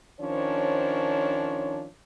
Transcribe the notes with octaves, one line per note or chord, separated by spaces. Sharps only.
D#3 F3 C#4 D4 C5 C#5